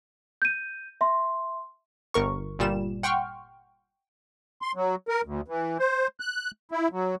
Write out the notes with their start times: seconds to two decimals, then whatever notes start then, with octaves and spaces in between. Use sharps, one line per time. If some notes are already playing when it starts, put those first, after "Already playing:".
0.42 G6 D#7
1.01 E5 C6
2.14 G1 A#4 C#6
2.59 G1 A#2 G3 E7
3.03 F#5 G5 C6 C#6 F6
4.62 C6
4.75 F#3
5.08 A#4
5.25 D2
5.48 E3
5.79 C5
6.20 F#6
6.71 E4
6.91 F#3